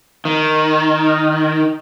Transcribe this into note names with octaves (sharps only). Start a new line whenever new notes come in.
D#3